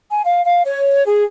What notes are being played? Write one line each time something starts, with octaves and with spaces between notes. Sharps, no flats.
G#5
F5
F5
C#5
G#4